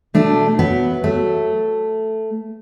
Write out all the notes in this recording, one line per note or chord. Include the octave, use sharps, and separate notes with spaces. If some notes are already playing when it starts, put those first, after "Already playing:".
B2 A3 D4
F#3 B3
F#3 A3